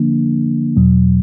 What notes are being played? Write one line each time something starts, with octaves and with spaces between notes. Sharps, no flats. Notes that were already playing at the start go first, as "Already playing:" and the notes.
Already playing: D3 F3 A#3 D4
E2 B2 F#3